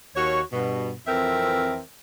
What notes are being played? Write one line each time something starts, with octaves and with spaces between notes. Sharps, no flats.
D#2 F#4 C#5
G2 B2
F2 E3 C4 A#4 E5